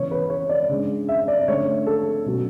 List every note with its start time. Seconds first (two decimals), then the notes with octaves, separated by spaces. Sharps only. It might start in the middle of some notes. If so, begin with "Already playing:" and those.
Already playing: C#3 E3 B3 C#5
0.11 B4
0.30 C#5
0.49 D5
0.69 C#3 G#3 D4
1.09 E5
1.28 D5
1.48 D3 A3 C#4 C#5
1.86 A4
2.26 B2 F#3 C#4